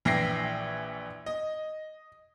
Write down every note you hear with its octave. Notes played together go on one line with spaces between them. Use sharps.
A#1 E3 E5 G5 A#6 C7
D#5